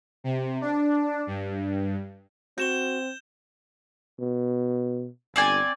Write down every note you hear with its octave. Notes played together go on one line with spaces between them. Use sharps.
C3
D4
G2
C4 F#4 G6 E7 G7
B2
G1 C4 D5 G#5